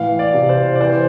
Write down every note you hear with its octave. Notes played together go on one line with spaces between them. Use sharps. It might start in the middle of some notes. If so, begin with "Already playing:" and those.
Already playing: A2 E3 F5
D5
C3
C5
D5
E3 C5